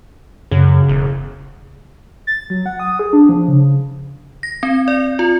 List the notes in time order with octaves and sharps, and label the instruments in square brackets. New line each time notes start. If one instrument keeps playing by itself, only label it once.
[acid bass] F#2 [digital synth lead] C#3
[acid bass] E1
[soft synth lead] A6
F#3
F#5
D#6
G#4
D4
F3
C#3
[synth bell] A#6
C4
D5
F4